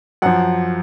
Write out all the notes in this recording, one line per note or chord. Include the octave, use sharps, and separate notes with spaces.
F#2 F3 F#5